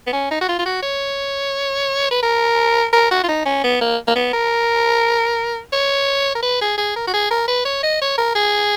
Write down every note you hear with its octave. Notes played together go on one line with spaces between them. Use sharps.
B3
C#4
D#4
F#4
F4
F4
F#4
C#5
B4
A#4
A#4
F#4
F4
D#4
C#4
B3
A#3
A#3
B3
A#4
C#5
A#4
B4
G#4
G#4
A#4
F#4
G#4
A#4
B4
C#5
D#5
C#5
A#4
G#4